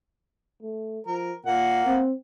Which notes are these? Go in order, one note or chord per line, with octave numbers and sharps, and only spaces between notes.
A3
F3 A#4
A#2 A#3 F#5
C4